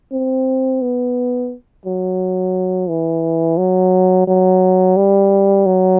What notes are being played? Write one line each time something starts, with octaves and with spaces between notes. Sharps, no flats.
C4
B3
F#3
E3
F#3
F#3
G3
F#3